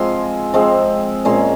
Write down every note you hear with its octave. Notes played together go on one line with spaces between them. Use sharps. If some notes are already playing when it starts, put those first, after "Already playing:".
Already playing: F3 G#3 C4 C6
F3 G#3 C4
A#2 G#3 C#4 C6